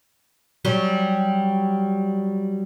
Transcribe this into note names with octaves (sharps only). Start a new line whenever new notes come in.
F#3 G3 C#4